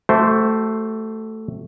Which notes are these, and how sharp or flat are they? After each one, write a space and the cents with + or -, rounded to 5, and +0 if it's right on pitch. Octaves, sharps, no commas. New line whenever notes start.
A3 +0 F#4 +45 C5 +0